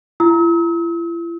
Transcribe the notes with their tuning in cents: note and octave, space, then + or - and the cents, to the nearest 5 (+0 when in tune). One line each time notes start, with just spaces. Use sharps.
E4 +45 E6 -45